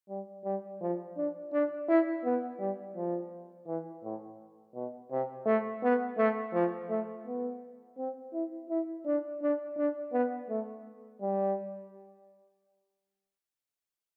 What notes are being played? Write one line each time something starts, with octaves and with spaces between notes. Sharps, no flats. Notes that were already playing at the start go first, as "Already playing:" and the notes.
G3
G3
F3
D4
D4
E4
B3
G3
F3
E3
A2
B2
C3
A3
B3
A3
F3
A3
B3
C4
E4
E4
D4
D4
D4
B3
A3
G3